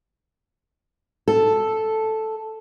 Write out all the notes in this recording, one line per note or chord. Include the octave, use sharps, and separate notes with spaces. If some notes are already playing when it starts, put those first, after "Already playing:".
A4